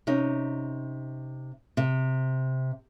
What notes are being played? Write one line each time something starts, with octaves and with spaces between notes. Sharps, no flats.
C3 C#4 D#4
C3